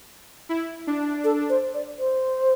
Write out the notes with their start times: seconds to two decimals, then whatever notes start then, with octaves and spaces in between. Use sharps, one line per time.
0.49 E4
0.87 D4
1.24 A4
1.49 C5
1.74 D5
1.99 C5